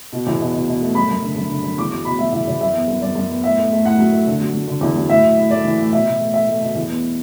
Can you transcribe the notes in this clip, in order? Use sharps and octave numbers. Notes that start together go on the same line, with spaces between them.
B2
E2
B2
B2
B2
A3
F#2 B5
F#2
D3
F#2
D3
F#2
E2 D6
F#3 D6
B2 B5
F#3 E5
E2 E5
E2 D5
F#2 E5
B3
F#2
F#2 D5
F#2
B3
A2 E5
A3
A3
A2 F#5
F#3
A3
D3
F#3
F#3
D3
E2
F#3
A2 E5
A2
A2
A3 D5
E3
A2
B2 E5
B2
A3
A3 E5
A3
B2
E2
B3